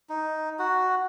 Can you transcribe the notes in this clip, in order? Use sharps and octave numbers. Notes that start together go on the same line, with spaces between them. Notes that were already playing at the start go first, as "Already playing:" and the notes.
D#4
F#4